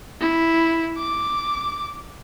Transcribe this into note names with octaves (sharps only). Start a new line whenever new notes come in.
E4
D6